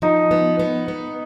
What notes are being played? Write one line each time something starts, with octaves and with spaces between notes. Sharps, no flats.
F3 D#4
B3
B3
B3